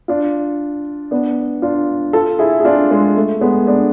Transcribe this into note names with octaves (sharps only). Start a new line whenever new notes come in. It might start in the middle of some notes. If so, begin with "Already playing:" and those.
D4 F4
B3 D4
D4 F4
F4 A4
E4 G#4
G#4
D4 F4
G#3
A3
G#3 B3
B3 D4